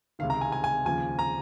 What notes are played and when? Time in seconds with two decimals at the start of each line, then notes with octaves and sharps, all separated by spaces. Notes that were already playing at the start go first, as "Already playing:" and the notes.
0.19 C#2 C3 D#3 F5
0.30 A#5
0.41 G#5
0.52 G#5
0.64 G#5
0.85 D#2 C#3 F3 G#5
1.19 A#5